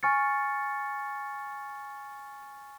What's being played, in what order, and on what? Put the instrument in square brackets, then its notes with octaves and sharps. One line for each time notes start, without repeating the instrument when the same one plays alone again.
[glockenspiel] G#5 C#6 F6 A6 C#7